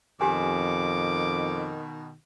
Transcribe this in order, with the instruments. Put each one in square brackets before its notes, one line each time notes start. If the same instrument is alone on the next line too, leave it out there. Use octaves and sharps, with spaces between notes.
[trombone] F2 [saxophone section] B2 D#3 [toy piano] G4 G#5 [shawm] D6